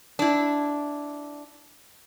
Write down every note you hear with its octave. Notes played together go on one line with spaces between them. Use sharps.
D4 E4